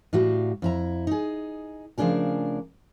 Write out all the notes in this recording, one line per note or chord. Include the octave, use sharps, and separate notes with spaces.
A2 G3 F#4 F5
F2 E4 A#5
D#4 G#4
C#3 F3 A3 D4 G#4 A#4